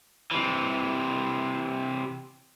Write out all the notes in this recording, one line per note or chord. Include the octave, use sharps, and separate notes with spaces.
C3 E3